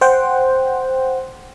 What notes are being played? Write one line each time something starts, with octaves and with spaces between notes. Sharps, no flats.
C5 F#5 G5